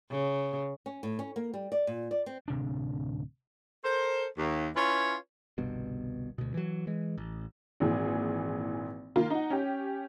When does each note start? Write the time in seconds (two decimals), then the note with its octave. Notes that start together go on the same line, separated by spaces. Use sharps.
0.11 C#3
0.86 C#4
1.03 A2
1.19 C#4
1.36 A#3
1.54 G3
1.72 D5
1.87 A#2
2.11 D5
2.26 C4
2.48 D1 C3 D4
3.85 A4 A#4 C5
4.38 D#2
4.76 C#4 E4 F4 B4 C#5
5.58 G1 C2 G2 B2
6.38 D2 B2
6.54 E3 F#3
6.87 E3 G#3
7.18 A1
7.80 G#1 A#2 E3 G#4
9.16 D#3 A#3 F4
9.30 D#4 F#5
9.50 C#4 G4